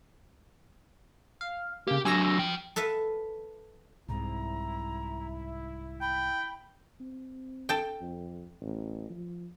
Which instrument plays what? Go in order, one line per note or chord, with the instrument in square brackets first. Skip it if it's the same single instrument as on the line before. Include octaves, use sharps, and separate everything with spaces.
[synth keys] F5
[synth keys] C#3 A#3 [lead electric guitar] G4
[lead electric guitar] F#3 D4 [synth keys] G#5 E6 A#6
[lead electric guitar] F3 G5
[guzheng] A4 B4 E5 F5
[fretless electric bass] C2 G#2 C3 [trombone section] E4 [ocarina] A#5
[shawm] G5 [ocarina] B5
[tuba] C4
[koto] A4 G5
[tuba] F2
A1
F3